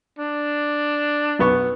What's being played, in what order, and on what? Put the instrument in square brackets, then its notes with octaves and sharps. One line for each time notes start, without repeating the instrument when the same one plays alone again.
[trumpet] D4
[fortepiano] B1 B3 C#6